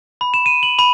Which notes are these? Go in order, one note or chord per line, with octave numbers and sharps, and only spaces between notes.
B5
E7
D#7
F#7
B5